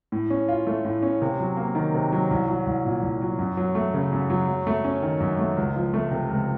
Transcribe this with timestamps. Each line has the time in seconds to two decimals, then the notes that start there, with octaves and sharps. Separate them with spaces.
0.12 A2
0.30 C#4
0.48 F4
0.67 A3
0.85 A2
1.03 C#4
1.22 C3
1.40 F#3
1.57 A#3
1.75 D#3
1.94 C3
2.12 F#3
2.31 C2
2.48 F#3
2.67 C2
2.85 A#2
3.03 C2
3.21 F#3
3.39 F#2
3.57 F#3
3.75 A3
3.94 C#3
4.12 F#2
4.30 F#3
4.48 F#2
4.67 A3
4.84 C#4
5.02 D#3
5.20 F#2
5.39 A3
5.57 C#2
5.76 F3
5.94 A3
6.11 C3
6.30 C#2